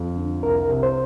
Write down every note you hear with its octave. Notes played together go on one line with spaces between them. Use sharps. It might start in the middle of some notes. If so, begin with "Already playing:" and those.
Already playing: F2
D3
C2 A#4
C3
C5